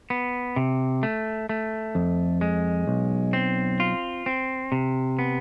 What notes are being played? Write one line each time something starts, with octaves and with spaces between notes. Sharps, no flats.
B3
C3
A3
A3
F2
G#3
B1
C4
F4
C4
C3
B3